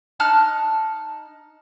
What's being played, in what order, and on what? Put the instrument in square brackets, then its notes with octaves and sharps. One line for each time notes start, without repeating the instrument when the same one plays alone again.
[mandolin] D#4 A5 F6 F#6